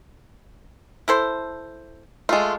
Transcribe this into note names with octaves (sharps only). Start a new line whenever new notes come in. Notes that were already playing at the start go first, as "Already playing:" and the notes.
E4 A4 C5
G#3 A3 F4